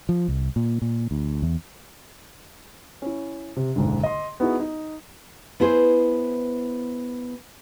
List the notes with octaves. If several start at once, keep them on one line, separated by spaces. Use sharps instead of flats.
F3
C2
A#2
A#2
D2
E2
C#4 E4
C3
F#1 B1 G#2 D3
D#5 C6
B3 D#4 E4 F#4 G#4
D#4
B3 E4 G#4 C5